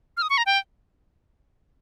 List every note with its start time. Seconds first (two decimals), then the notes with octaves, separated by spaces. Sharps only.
0.17 F6
0.22 D#6
0.30 C#6
0.38 A#5
0.46 G5